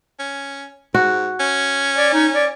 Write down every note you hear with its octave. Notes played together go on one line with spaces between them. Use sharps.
C#4
G#2 F#4
C#4
D5
D#4
D5